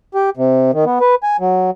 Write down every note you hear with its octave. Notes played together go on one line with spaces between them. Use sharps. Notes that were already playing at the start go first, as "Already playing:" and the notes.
G4
C3
D#3
B3
B4
G#5
F#3